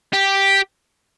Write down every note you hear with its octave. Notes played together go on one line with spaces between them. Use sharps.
G4